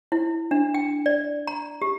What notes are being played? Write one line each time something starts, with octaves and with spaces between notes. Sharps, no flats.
E4
D4
G5
D5
A#5
G4